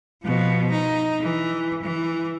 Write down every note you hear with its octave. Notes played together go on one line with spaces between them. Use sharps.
B2 F3
D#4
E3
E3